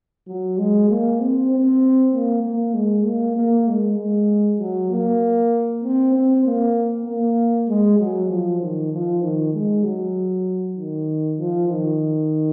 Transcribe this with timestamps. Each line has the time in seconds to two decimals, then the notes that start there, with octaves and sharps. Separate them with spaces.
0.28 F#3
0.58 G#3
0.89 A#3
1.20 C4
1.51 C4
2.13 A#3
2.43 A#3
2.74 G#3
3.05 A#3
3.37 A#3
3.68 G#3
3.98 G#3
4.59 F#3
4.91 A#3
5.83 C4
6.14 C4
6.45 A#3
7.06 A#3
7.68 G#3
7.99 F#3
8.29 F3
8.61 D#3
8.92 F3
9.22 D#3
9.54 G#3
9.84 F#3
10.77 D#3
11.38 F3
11.69 D#3